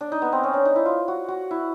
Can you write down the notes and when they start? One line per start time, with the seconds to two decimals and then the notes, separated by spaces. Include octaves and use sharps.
0.01 D4
0.12 D#4
0.22 B3
0.32 C4
0.44 C#4
0.54 D4
0.65 D#4
0.76 E4
0.86 F4
1.08 F#4
1.28 F#4
1.51 E4